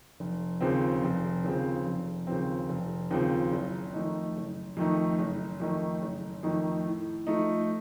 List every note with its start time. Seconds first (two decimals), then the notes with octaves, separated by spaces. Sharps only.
0.20 F1
0.61 D#2 C#3 F3 C4
1.03 F1
1.44 D#2 C#3 F3 C4
1.86 F1
2.27 D#2 C#3 F3 C4
2.69 F1
3.11 D#2 C#3 F3 C4
3.52 F#1
3.93 F2 D#3 A3 D#4
4.35 F#1
4.77 F2 D#3 A3 D#4
5.19 F#1
5.60 F2 D#3 A3 D#4
6.02 F#1
6.43 F2 D#3 A3 D#4
6.85 A2
7.27 F3 A3 D#4